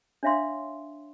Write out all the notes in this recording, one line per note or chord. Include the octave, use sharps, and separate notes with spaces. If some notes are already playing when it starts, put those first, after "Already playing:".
D4 C#5 E5 F5 C6